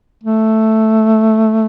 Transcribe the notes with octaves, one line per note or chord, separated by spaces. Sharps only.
A3